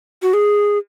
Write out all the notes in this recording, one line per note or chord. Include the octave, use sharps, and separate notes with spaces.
F#4
G#4